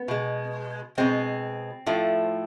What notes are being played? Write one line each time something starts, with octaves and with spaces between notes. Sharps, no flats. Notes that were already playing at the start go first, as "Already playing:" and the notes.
Already playing: B3
B2 G#3
B2 G#3 C4
A2 F3 A3